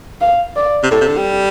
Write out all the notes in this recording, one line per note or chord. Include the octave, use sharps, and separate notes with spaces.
F5
D5
C3
A2 A4
C3
D3
G3